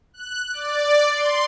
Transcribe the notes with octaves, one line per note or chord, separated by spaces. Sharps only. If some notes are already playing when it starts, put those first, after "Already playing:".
F#6
D5
C6